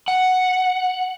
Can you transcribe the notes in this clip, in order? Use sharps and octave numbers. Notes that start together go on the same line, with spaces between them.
F#5